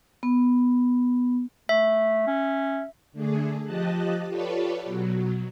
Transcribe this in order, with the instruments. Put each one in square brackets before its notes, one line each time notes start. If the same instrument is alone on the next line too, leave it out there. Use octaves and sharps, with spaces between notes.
[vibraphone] B3
[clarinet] A3 [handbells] E5
[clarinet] C#4
[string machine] D3 A3 D4 G#4
F3 G4 D#5 A5 F#6
F4 G4 A4 B4 C#5 D5
B2 F#3